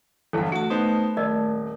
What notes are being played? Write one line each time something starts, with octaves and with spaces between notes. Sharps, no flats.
G1 E2 G2 A4 F#5
A3 F#4 A5
B3 D#4 C5
D#1 A#4 D5 D#5